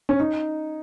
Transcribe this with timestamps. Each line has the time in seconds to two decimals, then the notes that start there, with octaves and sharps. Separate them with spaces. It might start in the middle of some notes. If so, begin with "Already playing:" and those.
0.09 C#4
0.20 D#4